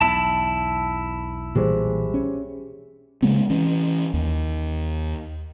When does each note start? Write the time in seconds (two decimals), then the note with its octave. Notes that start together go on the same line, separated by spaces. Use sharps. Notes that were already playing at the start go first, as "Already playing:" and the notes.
0.01 B1 E2 E4 A5
1.55 A#2 E3 G3 G4 G#4 C5
2.14 C#4
3.22 C#3 G#3 A#3 C4
3.50 E3 C#4
4.14 D#2